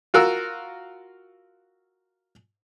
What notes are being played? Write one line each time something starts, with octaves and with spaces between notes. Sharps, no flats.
F4 F#4 A#4 E6